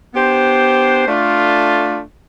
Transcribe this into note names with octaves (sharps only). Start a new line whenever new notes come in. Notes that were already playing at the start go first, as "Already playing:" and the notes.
B3 D4 G4 C5
A3 D4 F4